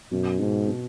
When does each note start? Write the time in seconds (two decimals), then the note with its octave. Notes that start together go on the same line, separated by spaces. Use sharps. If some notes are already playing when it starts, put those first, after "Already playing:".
0.12 F#2 B2
0.40 G#2 B2
0.68 B2